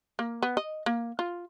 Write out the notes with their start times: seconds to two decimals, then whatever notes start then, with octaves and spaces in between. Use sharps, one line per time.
0.19 A#3
0.42 B3
0.57 D#5
0.86 A#3
1.19 F4